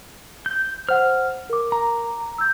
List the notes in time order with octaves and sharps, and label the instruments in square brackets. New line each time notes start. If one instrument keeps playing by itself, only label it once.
[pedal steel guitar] G6
[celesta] C5 F#5 [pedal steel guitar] F6
[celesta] A#4 D6
[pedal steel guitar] A#5
[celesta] E6 G6